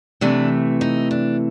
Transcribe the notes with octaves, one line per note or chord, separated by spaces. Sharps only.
C3 E3 A3 D4
D#4
D4